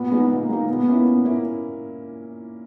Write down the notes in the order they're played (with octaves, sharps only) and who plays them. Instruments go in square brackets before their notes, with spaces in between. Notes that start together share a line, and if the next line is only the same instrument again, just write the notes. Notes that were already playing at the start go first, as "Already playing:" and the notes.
Already playing: [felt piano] A#2 [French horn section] B3
[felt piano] G#3 D#4
[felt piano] A#2 [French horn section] A#3
[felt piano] G#3 D#4
[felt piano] A#2 [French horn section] B3
[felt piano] A#3 C#4 E4
A#2
A#3 C#4 E4